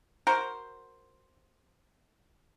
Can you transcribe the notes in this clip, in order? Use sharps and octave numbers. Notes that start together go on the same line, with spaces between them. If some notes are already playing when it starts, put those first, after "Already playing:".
F#4 A#4 C5